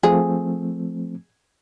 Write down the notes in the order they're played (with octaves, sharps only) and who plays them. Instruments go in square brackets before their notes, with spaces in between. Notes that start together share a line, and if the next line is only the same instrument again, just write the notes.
[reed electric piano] F3 A3 C4 [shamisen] G#4